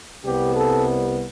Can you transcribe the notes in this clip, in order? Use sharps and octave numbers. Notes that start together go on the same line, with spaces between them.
C2 C3 G3 B3 G4
A4